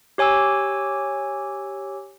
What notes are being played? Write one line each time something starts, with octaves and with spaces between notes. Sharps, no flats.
G4 C#5 G#5 D6 E6